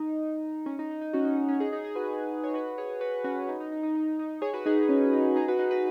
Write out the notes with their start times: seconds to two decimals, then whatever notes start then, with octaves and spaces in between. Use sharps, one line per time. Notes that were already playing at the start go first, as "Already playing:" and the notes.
Already playing: D#4
0.66 C#4
0.79 D#4
0.91 D#4
1.01 D#4
1.13 C#4 F#4
1.25 D#4
1.37 D#4
1.48 C#4
1.60 D#4 G#4
1.72 D#4 G#4
1.84 D#4 G#4
1.95 F#4 B4
2.44 C#5
2.54 F#4 B4
2.78 G#4 C#5
3.01 F#4 B4
3.24 C#4 F#4
3.49 D#4
3.60 D#4
3.72 D#4
3.83 D#4
3.95 D#4
4.19 D#4
4.42 G#4 C#5
4.53 F#4 B4
4.66 D#4 G#4
4.78 D#4
4.89 C#4
5.13 D#4
5.36 D#4 G#4
5.48 F#4 B4
5.59 D#4 G#4
5.71 F#4 B4